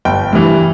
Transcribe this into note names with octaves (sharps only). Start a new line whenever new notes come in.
G1 G5
G2 E3